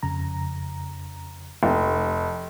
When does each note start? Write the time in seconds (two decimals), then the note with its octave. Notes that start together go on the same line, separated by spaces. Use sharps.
0.03 F2 C#3 A#5
1.63 F1